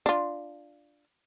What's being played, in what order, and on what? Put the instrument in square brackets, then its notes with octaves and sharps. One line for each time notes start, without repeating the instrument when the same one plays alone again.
[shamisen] D4 F4